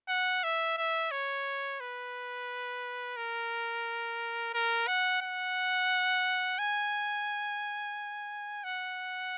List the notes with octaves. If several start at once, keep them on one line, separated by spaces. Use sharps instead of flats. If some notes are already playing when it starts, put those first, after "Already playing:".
F#5
E5
E5
C#5
B4
A#4
A#4
F#5
F#5
G#5
F#5